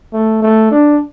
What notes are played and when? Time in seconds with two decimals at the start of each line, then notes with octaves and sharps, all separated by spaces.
0.14 A3
0.42 A3
0.71 D4